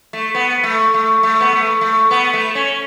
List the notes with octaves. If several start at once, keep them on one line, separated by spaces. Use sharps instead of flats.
A3
B3
A3
A3
A3
B3
A3
A3
B3
A3
C#4